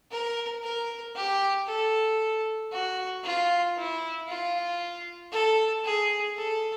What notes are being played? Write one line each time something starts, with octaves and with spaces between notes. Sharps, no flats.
A#4
A#4
G4
A4
F#4
F4
E4
F4
A4
G#4
A4